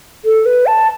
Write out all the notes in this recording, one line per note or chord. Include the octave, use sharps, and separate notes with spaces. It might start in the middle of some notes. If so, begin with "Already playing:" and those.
A4
B4
A5